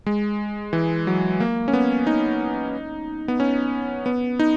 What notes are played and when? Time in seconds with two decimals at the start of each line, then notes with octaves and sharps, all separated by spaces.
0.06 G#3
0.73 E3
1.07 F#3
1.40 A#3
1.68 C#4
1.73 B3
2.07 D#4
3.28 B3
3.40 C#4
4.06 B3
4.39 D#4